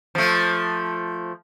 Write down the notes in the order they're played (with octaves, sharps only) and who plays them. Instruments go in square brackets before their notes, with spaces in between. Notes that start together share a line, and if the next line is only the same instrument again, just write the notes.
[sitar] F3 A3